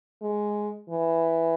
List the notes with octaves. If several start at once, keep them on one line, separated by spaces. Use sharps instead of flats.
G#3
E3